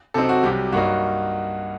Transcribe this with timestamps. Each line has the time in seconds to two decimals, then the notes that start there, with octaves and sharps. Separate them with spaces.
0.14 C3 F#3 C4 D#4 A4
0.29 F#4
0.43 C2 C3 F#3 G4
0.72 G2 F#3 A#3 D#4 F#4